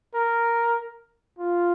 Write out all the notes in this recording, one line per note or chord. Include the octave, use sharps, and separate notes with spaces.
A#4
F4